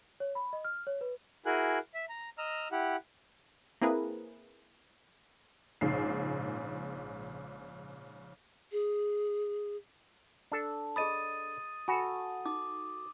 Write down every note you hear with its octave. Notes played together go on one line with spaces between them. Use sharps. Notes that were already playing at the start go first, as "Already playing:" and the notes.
C#5
B5
D#5
F6
C#5
B4
E4 F#4 G#4 A#4 G#5 F#6
E5
A#5
D#5 A#5 E6 F6
E4 G4 F#5
A#3 C4 E4 G#4 A#4 B4
A#1 G#2 C#3 C7
G#4
D4 A4 A5
G#4 D#5 B5 D#6 A6 D#7
F#4 A4 G#5 B5
D#4 D6